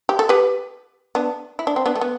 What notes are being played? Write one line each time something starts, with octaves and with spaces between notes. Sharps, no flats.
G4
A4
G4 B4
B3 D4
E4
D4
C4
B3 D4
A3
B3